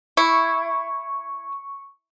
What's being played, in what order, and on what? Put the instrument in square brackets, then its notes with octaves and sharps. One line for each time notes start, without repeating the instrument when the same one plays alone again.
[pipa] E4 [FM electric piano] C#6